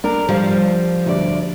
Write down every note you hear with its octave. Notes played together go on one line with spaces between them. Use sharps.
D4 A#4
F3 G3
D2 D5